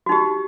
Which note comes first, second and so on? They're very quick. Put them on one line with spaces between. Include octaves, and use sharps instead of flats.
F#4 D#4 G4